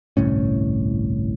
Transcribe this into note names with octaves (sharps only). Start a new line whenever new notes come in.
G1 C2 A2 C#4